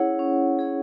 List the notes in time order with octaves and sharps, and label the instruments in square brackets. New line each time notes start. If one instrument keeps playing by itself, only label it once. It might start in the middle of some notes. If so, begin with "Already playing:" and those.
Already playing: [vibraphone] C#4 E4 G#4 C#5 F#5
C#4
E4 G#4 C#5 F#5